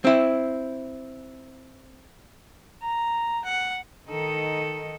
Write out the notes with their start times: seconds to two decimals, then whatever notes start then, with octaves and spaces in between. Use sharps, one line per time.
0.05 C4 E4
2.81 A#5
3.44 F#5
4.09 D#3 D#4 A4